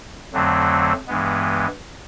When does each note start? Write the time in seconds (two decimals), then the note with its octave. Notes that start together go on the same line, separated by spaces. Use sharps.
0.33 F2 D3 F#3 A3 C4
1.07 G2 E3 G#3 B3